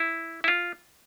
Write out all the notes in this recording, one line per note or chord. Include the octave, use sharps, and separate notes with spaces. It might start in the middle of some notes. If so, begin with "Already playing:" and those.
Already playing: E4
E4
F4